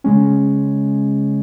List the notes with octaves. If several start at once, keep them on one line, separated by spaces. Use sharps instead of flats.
C#3 G#3 C#4